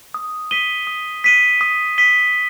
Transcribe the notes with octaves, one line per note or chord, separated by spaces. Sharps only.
D#6
B6 D#7 G7
D#6
B6 D#7 G7
D#6
B6 D#7 G7